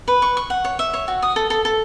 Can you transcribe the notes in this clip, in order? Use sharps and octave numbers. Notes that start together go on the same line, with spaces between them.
B4
C#6
C#6
F#5
C#5
E5
C#5
F#4
D#6
A4
A4
A4